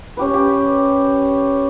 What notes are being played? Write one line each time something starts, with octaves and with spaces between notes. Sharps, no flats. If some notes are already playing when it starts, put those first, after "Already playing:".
C#4 G4 B4
G4